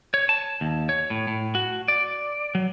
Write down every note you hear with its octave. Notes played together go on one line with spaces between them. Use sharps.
C#5
A5
D#2
C#5
A2
A2
F#4
D5
F#3